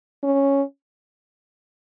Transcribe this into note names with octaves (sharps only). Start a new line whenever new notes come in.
C#4